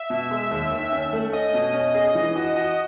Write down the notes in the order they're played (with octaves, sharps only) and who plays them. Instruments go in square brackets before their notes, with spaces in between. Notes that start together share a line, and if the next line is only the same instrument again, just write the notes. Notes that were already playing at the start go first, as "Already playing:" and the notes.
Already playing: [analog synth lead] E5
[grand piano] B2
G#3
D#2
D#3
C#4
A3
[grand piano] C#4 [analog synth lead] D#5
[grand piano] B2
C#4
G#4
E3
F#4
F#4